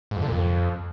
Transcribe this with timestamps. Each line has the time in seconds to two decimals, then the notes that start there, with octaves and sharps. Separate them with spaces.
0.11 G#2
0.16 F2
0.22 D3
0.27 A#2
0.32 F2